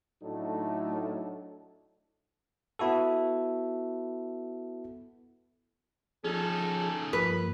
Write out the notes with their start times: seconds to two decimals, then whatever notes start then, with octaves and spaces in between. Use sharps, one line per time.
0.22 A2 F#3 A3 D4 D#4 A4
2.79 B3 E4 F#4 A4
6.24 F3 C#4 D#4 G#4 A4
7.13 G2 F3 A#3 B4